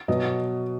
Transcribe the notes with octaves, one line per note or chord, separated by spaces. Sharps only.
B2 F#3 D#5